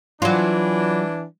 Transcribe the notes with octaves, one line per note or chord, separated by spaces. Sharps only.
E3 F#3 D4 F4